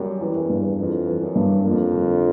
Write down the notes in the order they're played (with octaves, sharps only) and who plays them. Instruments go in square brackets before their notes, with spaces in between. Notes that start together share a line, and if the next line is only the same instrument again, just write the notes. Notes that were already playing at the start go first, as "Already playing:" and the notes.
Already playing: [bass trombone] F#2 [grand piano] G3
[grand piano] E3
[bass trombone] E2
[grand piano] G2
[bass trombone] F2 [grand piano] E3
[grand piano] E3
[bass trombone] F#2
[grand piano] G2
[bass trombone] F2 [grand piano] A#3
[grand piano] D3